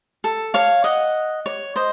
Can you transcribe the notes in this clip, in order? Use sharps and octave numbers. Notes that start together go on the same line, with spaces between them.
A4
C#5 F5
D#5 F#5
C#5
C5 D#5